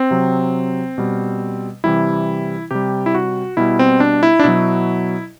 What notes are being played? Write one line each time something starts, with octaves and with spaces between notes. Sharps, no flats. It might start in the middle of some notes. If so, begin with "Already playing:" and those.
Already playing: C4
C3 F#3
B2 G3
C3 E3 G3 E4
C3 G3 G4
E4
F#4
B2 G3 E4
C4
D4
E4
D4
B2 F#3 E4